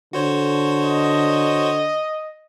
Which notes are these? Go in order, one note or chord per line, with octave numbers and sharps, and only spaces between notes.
D3 F#4 C5 C#5
D#5